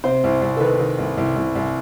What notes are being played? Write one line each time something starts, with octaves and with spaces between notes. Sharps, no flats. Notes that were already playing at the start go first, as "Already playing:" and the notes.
C3 C5
C2
C2
A4
D#3 B4
D#3
C2
C2
C2
C2